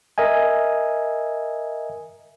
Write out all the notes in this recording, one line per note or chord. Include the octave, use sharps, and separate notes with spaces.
A#4 D#5 E5 G#5